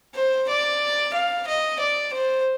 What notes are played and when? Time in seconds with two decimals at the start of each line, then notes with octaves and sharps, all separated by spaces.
0.15 C5
0.49 D5
1.13 F5
1.47 D#5
1.79 D5
2.13 C5